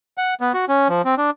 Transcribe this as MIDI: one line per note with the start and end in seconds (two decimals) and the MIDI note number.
0.18 0.34 78
0.41 0.52 59
0.54 0.65 66
0.69 0.88 61
0.89 1.02 53
1.05 1.15 60
1.18 1.30 62